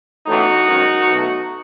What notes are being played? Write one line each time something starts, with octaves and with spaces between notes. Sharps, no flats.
A1 A2 E3 B3 D#4 F#4
G#1 F#2 D#3
B1 B2 A3